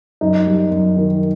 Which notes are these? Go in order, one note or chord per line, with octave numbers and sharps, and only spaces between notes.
F#2 D#4
G3
F#2
D#3